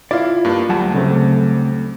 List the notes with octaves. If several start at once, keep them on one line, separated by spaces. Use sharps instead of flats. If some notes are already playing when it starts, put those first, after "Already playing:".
E4 F4 D5
G2 A#3 D4
D2 F#3 G3 F#5 A5
C#3 A3 C4